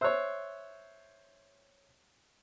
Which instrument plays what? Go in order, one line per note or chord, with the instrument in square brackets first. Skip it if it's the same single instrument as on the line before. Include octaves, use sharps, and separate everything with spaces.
[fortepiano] C5 C#5 [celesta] E5 E6 F#6